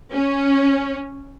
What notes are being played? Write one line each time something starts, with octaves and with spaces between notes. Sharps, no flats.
C#4